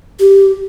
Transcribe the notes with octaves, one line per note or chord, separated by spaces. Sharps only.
G4